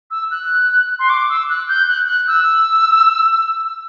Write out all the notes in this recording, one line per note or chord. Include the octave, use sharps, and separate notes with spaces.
E6
F#6
C6
D6
E6
F#6
G6
F#6
F#6
E6